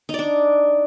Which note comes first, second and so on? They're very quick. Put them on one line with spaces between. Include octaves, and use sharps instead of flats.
D#4 D5 D4